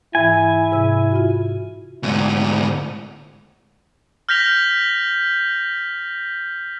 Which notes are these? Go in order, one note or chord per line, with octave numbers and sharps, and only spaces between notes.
G#2 E3 E4 G#5
G#2 C3 E6
F4 F#4
D2 G#2
F6 G6 A#6 B6 F7 G7